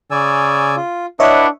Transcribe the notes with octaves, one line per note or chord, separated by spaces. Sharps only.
C#3 D5 G#5 E6
F4
D4 E4 B4 C#5 D#5 E5 F#5